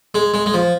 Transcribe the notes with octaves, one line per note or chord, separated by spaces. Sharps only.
G#3
G#3
G#3
F3